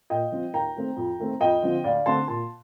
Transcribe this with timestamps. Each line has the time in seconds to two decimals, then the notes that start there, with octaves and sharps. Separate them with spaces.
0.10 A#2 D#5 G5
0.32 F3 C4
0.54 D#2 G5 A#5
0.76 D#3 A3 C4
0.97 F2
1.19 D#3 A3 C4
1.41 F2 D#5 G5
1.62 D3 F3 C4
1.84 D2 D5 F5
2.06 D3 A3 C4 A5 C6
2.28 A#2 A5 C6